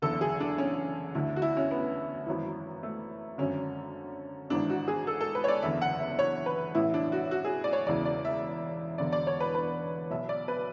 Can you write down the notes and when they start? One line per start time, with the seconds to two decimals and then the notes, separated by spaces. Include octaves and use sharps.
0.02 F#1 E2 D3 A4
0.21 G#4
0.40 D4
0.58 C#4
1.15 D2 D3 E4
1.36 F#4
1.42 E4
1.57 C#4
1.71 B3
2.26 G#1 F#2 E3
2.83 A3
3.38 G#1 F#2 D3 C#4
4.50 G#1 G#2 E3 D4
4.70 F#4
4.88 G#4
5.07 A4
5.21 A4
5.35 B4
5.44 C#5
5.48 D5
5.62 F#1 E2 D3 E5
5.82 F#5
6.00 E5
6.19 C#5
6.46 B4
6.75 A1 A2 E3 E4
6.94 D4
7.12 F#4
7.31 F#4
7.44 G#4
7.64 D5
7.73 C#5
7.86 E1 E2 C#3 E3 D5
8.05 D5
8.25 E5
8.98 E1 E2 D3 D5
9.12 D5
9.27 C#5
9.40 B4
9.55 B4
10.11 B1 B2 E5
10.29 D5
10.48 B4